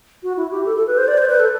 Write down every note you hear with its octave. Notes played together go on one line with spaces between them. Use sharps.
F#4
E4
G4
A4
A4
B4
C5
D5
C5
B4
A4